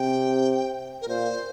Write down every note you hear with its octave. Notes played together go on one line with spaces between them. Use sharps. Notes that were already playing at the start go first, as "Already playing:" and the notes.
Already playing: C3 G5
A#4
A#2 C5